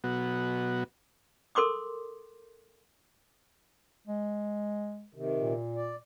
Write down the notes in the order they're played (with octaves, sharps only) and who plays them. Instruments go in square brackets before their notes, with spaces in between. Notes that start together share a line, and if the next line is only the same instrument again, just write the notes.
[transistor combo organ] B2 F#3 B3 F#4
[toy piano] A4 A#4 C6 D6 D#6
[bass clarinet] G#3
[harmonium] C3 D#3
[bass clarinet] A#2
[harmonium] D5